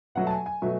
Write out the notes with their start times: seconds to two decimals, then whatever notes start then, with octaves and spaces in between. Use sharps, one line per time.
0.15 B2 F#3 A3 F#5
0.27 A5
0.30 G#5
0.46 G#5
0.62 B2 F#3 A3